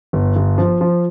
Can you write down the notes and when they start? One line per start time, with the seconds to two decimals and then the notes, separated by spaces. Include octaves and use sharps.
0.13 G1
0.36 G1
0.58 F3
0.81 F3